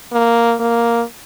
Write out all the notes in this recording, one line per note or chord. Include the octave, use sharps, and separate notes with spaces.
A#3
A#3